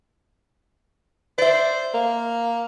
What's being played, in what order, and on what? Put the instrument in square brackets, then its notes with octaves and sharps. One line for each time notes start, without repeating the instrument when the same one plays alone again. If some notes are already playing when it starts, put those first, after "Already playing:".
[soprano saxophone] C5 [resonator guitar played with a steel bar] D5 E5
[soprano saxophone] A#3